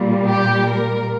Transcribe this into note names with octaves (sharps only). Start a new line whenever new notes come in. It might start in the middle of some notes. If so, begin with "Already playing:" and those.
Already playing: A#2 G3
G4
A#4